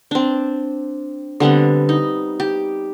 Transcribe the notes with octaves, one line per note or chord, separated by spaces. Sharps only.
C4 D4
D3 G3 B3 C4
D#4
G4